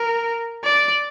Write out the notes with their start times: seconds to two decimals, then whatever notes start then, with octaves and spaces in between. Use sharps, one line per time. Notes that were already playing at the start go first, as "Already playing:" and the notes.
Already playing: A#4
0.64 D5